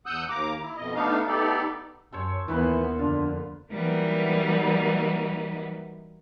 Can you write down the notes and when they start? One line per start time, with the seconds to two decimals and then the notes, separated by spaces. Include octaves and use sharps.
0.06 E2 F#5 D#6 E6 F#6 G6
0.29 D#2 A#3 A#5 D6
0.62 E4
0.77 F2 B2 D#5
0.95 A3 B3 D4 D#4 F5
1.27 A3 B3 D#4 G4 A4 D5
2.12 F#2 A4 C5 C#5
2.48 D#2 A#2 E3 B3 B4 C5
2.99 F2 D3 D4 F4
3.70 E3 F#3 G3 A#3 B3 D#4